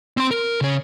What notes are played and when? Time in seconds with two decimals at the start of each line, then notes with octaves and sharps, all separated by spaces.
0.17 C4 C6
0.31 A#4
0.61 C#3 C#5